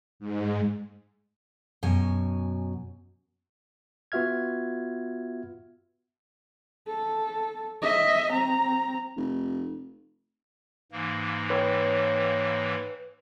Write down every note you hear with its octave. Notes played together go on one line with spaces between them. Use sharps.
G#2
F#2 B2 G#5
B3 F4 F#4 E5 F6 G#6
A4
D#5 E5
C4 A#5
F1
G#2 E3 A#3
B4 C#5 G5